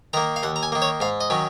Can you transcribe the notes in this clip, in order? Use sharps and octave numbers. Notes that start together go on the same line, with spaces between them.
D#3 A#3 A#5
F5
D#2 F#5
A#5
G#5
D#3 A#3
C#5
G#2 F5
D#5
D#3 F#3 C#4